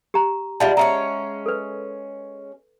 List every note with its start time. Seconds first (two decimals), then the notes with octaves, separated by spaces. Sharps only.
0.14 G4 A#5
0.60 G3 G#3 F4 E5 F#5 A5
0.77 G#3 C#4 C#5 E5 A#5
1.46 A4 B4